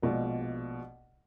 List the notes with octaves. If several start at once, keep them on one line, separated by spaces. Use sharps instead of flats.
A#1 B2 G#3 F4 D5